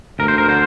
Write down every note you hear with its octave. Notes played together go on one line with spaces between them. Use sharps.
D2 A#4
C5
A#4
D3 C5